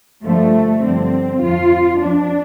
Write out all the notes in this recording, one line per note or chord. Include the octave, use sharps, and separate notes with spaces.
G2 D3 F3 A3
G2 D3 F3 C4
F2 F3 F4
F2 F3 D4